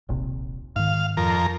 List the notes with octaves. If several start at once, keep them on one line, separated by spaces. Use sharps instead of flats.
D#1 A#1 C3
G#2 D#3 F5
F2 A#4